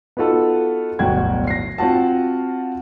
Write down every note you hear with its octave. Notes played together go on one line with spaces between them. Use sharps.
B3 D#4 F4 F#4 A4
D1 G1 B2 F#4 G5 G#6
A#6 C7
C4 F4 F#4 A5